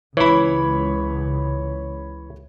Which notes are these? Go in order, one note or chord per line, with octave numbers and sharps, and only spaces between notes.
C#2 E3 E4 C#5 B5